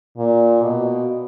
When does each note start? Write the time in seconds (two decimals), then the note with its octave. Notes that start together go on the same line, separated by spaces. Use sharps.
0.18 A#2
0.62 B2